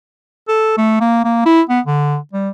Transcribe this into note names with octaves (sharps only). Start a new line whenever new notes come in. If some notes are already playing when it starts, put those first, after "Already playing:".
A4
A3
A#3
A#3
E4
B3
D3
G3